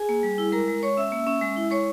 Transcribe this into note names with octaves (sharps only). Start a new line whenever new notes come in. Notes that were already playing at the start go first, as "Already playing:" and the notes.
Already playing: G#4 G#5
A#3
G3
E4
G#3 A#4 A#5
G#3
G#3 C#5 C#6
C#4 E5 E6
A#3
C#4
G#3
E4
G#3 C#5 C#6